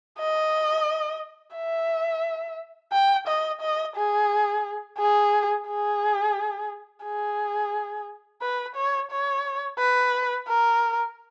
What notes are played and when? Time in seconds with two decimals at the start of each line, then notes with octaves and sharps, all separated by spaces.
0.18 D#5
1.55 E5
2.93 G5
3.27 D#5
3.61 D#5
3.96 G#4
4.98 G#4
5.68 G#4
7.05 G#4
8.42 B4
8.76 C#5
9.11 C#5
9.79 B4
10.48 A#4